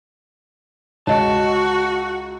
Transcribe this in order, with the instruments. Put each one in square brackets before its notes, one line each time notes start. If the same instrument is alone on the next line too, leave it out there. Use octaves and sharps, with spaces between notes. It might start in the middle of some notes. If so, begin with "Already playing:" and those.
[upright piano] C#2 [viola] F#4 [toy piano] C#5 D#5 [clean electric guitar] A5